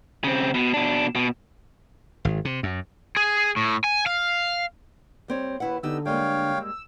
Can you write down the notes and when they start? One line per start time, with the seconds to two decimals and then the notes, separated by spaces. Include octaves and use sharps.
0.24 C#3 C4
0.54 B2
0.74 B2 D4
1.15 B2
2.25 G#1
2.45 C3
2.63 F#2
3.16 G#4
3.57 A2
3.84 G#5
4.06 F5
5.28 G3 C4 C#5
5.60 D#2 E4 B4 F#5
5.83 D3 B3 D#4 G4 E6
6.06 G3 G#3 A#3 C#5 F5 G5
6.61 E6